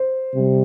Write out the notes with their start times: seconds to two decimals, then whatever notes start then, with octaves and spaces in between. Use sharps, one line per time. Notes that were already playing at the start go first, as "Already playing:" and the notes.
Already playing: C5
0.32 C3 G3